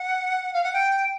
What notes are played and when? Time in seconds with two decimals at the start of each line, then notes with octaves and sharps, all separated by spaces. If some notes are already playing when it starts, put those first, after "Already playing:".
Already playing: F#5
0.53 F5
0.63 F#5
0.74 G5